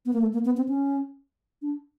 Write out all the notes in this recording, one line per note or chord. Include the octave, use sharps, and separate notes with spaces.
B3
A#3
A3
A#3
B3
C4
C#4
D4